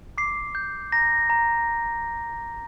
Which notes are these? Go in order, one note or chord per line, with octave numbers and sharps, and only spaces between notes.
D6 C7
G6
A#5 A#6
A#5